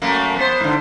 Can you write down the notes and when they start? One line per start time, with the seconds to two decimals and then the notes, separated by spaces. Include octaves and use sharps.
0.02 F#2 A3 A#3
0.36 B3 C5
0.60 G#2 D3